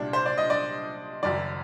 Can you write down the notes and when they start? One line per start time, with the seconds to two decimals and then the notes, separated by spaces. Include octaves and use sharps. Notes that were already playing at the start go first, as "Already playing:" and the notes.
Already playing: C2 A#2 G3 D4
0.13 C5
0.26 D5
0.38 D#5
0.50 D5
1.23 F#1 F#2 D#3 D5